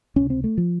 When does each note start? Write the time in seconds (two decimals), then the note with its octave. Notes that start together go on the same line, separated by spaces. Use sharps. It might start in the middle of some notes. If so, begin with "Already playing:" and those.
0.16 C#2 C3 C#4
0.30 C4
0.44 A3
0.58 F3